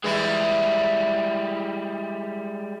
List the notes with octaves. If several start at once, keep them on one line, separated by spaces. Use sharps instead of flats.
E3 G3 G#3 E4